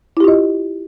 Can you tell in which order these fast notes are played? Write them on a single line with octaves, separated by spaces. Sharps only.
E4 G4 F4 D#5